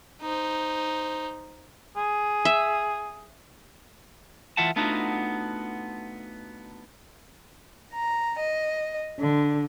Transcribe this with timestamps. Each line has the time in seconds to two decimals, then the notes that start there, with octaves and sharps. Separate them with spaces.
0.21 D#4 C5
1.96 G#4
2.45 E5
4.57 E3 F4 E5 F#5 A5
4.76 A3 B3 D4 D#4 F4 F#4
7.92 A#5
8.39 D#5
9.18 D3